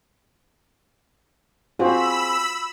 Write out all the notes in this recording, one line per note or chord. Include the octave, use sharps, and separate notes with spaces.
C4 F4 F#4 G#4 C5 B5 E6